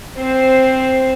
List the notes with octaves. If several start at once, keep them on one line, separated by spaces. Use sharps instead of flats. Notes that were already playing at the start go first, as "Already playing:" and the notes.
C4 C5